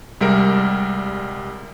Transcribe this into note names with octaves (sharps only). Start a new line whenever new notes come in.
C2 G3 G#3 A#4 D7